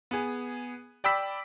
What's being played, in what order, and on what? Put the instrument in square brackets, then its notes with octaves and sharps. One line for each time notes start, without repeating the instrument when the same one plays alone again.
[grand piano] B3 G#4
D5 G5 B5 E6 B6